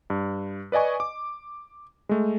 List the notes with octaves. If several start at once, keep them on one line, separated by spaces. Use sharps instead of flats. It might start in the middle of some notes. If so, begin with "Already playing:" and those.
G2
B4 D5 D#5 G#5 C#6
D6
G#3 A3